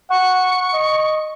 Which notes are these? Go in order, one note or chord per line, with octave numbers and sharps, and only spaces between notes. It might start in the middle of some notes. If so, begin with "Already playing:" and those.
F#5 C#6
D#5